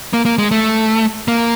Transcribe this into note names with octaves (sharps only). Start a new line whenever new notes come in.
A#3
A#3
G#3
A3
A#3